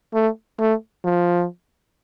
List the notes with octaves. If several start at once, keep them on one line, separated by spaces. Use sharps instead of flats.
A3
A3
F3